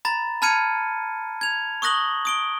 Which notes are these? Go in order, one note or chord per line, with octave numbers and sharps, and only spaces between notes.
A#5 B5 A6
A5 B5 F6 G#6 C#7 D#7
G#6 F7
C#6 D#6 F#6 A#6 F#7 G7
D#6 D7 G7